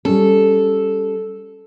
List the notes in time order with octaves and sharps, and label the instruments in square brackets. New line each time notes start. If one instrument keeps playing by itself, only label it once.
[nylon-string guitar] G3 C#4 [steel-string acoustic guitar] A4